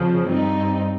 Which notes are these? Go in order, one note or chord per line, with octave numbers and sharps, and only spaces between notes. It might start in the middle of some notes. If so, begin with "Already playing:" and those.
Already playing: F2 C#3 F3
G2 G3 C4 D#4